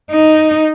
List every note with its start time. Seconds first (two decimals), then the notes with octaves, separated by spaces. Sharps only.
0.11 D#4